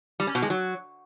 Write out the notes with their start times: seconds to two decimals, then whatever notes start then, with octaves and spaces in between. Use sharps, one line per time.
0.20 G3
0.27 C#4
0.35 B2
0.42 G#3
0.50 F#3